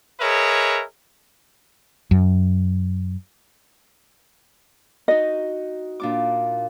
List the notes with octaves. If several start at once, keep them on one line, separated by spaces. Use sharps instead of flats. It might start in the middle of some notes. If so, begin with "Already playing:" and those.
G#4 A#4 B4 C#5 D#5 E5
F#2
D#4 F#4 D#5
A#2 D4 D6